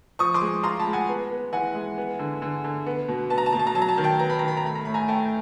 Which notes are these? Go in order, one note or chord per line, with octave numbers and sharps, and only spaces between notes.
F3 C#6 D#6
C6 D6
G#3
F4 A#5 C6
A5 B5
G#3
F#5 G#5
B3
B3
E3 F#5 G#5
G#3
B3
D3
D3
D3
B3
B2
B3 A5
A#5
A5
B2 A#5
A5
A#5
F#3 A5
A#5
A5
D#3 A#5
G5 A5
B3 A#5
B5
D#3 A#5
B5
A#5
A3 B5
A#5
A2 B5
G#5 A#5
A3 G5 A5